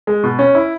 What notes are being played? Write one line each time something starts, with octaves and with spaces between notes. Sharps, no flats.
G#3
B2
C#4
E4